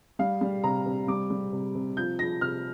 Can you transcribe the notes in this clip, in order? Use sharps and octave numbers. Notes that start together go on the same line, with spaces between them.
G3 F5
G3
C3 A#5
C3
G3 D6
G3
C3
C3
F3 G6
F3 A#6
C3 F6